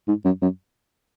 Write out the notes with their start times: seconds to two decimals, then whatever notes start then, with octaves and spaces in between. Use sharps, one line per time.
0.08 G#2
0.25 F#2
0.42 F#2